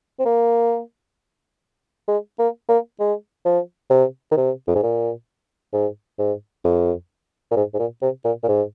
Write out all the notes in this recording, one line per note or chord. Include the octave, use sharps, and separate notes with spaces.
C4
A#3
G#3
A#3
A#3
G#3
F3
C3
D#3
C3
F2
G#2
A#2
G#2
G#2
F2
A#2
G#2
G#2
A#2
C3
A#2
A#2
G#2